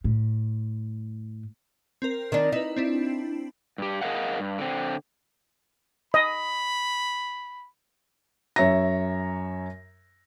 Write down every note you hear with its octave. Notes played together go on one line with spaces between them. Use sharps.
A2
C4 A#4
D#3 D4
D#4 E4 B4
C4 D4 E4
G2 G4
G#4 A#4 C5 D#5 F5 F#5
G2
D3 C4
D#5 B5
F#2 C#5 E5 A#5 A#6